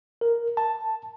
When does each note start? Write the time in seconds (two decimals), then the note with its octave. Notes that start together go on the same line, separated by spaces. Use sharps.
0.21 A#4
0.57 A5